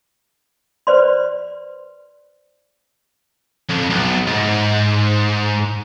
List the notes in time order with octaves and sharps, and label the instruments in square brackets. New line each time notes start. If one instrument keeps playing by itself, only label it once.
[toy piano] B4 C5 D5 C6
[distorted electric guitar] F2
B1
G#2